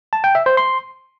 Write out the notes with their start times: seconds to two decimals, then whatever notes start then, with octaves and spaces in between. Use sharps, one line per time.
0.13 A5
0.24 G5
0.35 E5
0.46 C5
0.57 C6